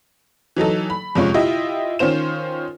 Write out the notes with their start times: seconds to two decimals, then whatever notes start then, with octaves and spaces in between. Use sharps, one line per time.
0.57 E3 F#3 D#4 A4
0.90 B5
1.15 F2 C3 G#3 C#4 F4 C#6
1.34 E4 F4 G4 D#5 E5
1.99 D#3 C#4 F4 C5 E7